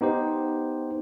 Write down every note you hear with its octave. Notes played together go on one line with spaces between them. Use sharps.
B3 D#4 G4 C5